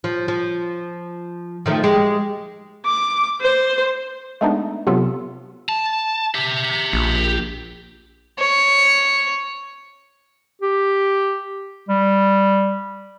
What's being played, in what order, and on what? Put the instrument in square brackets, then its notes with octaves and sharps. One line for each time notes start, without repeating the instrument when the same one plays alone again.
[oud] F3
F3
D#3 F3 A3
G#3 G4
[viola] D6
C5
[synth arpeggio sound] G#3 A3 B3 D4 D#4
C3 F#3 B3 F4 A4
[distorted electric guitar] A5
G4 E5
[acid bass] A#1
[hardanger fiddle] C#5
[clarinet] G4
G3